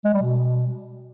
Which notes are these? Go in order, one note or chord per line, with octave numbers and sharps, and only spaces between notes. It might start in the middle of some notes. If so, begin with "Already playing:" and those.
G#3
G3
B2